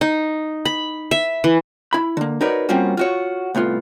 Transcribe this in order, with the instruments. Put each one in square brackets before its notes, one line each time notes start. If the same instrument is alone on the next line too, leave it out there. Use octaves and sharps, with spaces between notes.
[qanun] D#4
B5
E5
E3
[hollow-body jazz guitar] E4 B5
D3 A#3
D#4 F#4 A#4 B4 C#5 D5
G3 A#3 C4 C#4 F4 F#4
F4 F#4 C#5
C2 A2 B3 F4